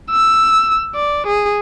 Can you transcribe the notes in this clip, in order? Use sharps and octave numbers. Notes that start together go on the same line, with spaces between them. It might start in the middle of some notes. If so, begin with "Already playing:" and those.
E6
D5
G#4